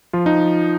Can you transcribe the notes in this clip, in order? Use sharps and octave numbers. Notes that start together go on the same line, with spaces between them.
F3 F4
D#4